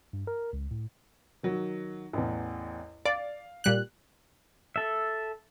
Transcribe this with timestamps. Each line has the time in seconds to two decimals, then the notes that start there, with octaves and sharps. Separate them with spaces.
0.13 G2
0.27 A#4
0.53 C#2
0.71 A2
1.43 D#3 F#3
2.13 A1 E2
3.05 D5 F5
3.64 A#2 G3 F#6
4.76 A4 E5